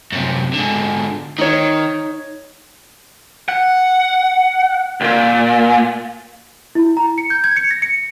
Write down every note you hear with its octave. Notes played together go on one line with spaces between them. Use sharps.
F#2 C3
G#2 D3
D#3 D#4 C#5
F#5
C#2 A#2
E4
A#5
C#7
G6
G#6
C#7
A#6
C#7